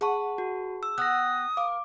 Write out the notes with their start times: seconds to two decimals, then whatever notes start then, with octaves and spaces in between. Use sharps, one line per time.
0.01 G#4 B4 F#5 A5 C#6
0.38 F#4
0.83 E6
0.98 B3 G4 D#6 F#6 A#6
1.57 A#4 F5 D6